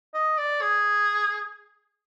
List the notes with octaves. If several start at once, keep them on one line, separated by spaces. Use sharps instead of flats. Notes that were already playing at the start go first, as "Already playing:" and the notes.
D#5
D5
G#4